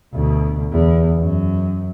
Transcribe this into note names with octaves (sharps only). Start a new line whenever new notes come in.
D2 B2
E2
F#2